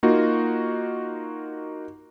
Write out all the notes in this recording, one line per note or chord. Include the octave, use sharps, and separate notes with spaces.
A#3 D#4 F4 F#4